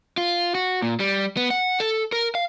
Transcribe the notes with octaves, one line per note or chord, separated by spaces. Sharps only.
F4
F#4
A#2
G3
B3
F#5
A4
A#4
F5